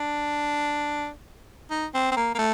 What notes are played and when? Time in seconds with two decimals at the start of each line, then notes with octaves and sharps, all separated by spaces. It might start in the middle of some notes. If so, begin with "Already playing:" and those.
Already playing: D4
1.71 D#4
1.94 C4
2.12 C4
2.16 A#3
2.35 A#3
2.39 A3